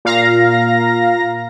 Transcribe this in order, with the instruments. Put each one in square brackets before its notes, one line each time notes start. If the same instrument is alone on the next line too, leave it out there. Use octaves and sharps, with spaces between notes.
[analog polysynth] A#2 F5 A#5 A#6